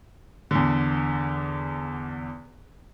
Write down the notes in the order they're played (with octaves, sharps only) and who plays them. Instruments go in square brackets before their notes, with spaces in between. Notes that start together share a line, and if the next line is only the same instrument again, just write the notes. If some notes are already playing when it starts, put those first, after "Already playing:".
[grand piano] E2 D3